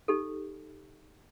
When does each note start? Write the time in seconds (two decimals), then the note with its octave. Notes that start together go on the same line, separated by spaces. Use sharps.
0.08 D#4 G4 A4